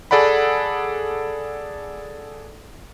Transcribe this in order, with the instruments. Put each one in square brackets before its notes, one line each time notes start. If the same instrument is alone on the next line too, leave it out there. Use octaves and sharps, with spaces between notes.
[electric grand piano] G#4 A4 D5 F#5 B5